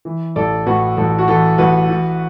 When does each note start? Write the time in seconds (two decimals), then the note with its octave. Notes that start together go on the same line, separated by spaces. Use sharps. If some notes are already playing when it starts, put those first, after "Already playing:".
0.05 E3
0.36 A1 A4 D5
0.67 A2 F#4 B4
0.97 A1 A4
1.19 F#4
1.28 E3 A4
1.58 A1 F#4 B4
1.89 E3